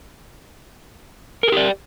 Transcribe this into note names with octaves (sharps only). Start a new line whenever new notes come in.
G4 G#4 A#4 D5